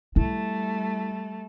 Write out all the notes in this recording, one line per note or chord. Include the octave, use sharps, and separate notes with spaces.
G3 A3 E4